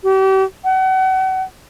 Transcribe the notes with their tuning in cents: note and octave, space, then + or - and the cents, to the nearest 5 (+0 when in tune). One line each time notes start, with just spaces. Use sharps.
G4 -40
F#5 +35